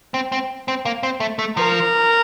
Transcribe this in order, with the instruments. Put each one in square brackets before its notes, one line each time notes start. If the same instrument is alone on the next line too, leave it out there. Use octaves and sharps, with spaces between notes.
[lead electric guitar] C4
C4
C4
A#3
C4
A3
A3
[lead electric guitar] F3 [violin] A#4